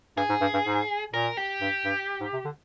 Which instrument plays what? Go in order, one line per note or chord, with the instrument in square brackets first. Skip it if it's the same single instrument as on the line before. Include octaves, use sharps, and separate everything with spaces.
[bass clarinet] G2 [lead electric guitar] G#4
[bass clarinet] G#2
G2
G2
G#2
[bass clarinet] A#2 [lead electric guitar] A#4
[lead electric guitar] G4
[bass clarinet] G2
G2
G#2
C3
D3